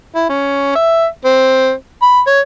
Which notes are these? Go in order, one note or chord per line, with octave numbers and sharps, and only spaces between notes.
E4
C#4
E5
C4
B5
C#5